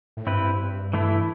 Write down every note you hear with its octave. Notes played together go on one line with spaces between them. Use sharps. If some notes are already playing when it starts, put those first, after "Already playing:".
A2
G2 C4 E4 B4
E3 A3 E4